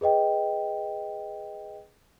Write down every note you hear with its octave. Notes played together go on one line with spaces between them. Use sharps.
G#4 B4 D#5 G5